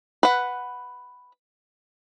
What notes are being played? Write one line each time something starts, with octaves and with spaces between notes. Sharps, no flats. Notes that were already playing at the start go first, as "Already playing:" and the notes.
B4 F#5